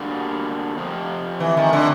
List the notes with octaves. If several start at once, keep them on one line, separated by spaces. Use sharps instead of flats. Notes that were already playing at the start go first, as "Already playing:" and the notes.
Already playing: D3 G3 A#3 D4 F#4
F2 C3 F3
E3
D#3
D3